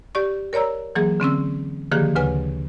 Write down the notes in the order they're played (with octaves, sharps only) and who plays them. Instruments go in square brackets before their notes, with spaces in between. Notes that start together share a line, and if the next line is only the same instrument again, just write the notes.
[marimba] G4 D5 C#6
A#4 C#5 D5 A#5 E6
E3 F#3 A#3 G#4
D3 C4 C#4 E6
D3 D#3 F3 A#3 G4 G#4
D2 C#3 B4 G#5 F6